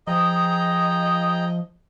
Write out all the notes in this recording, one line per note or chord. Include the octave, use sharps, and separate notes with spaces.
F3 G#4 D#5 G5 A#5 D#6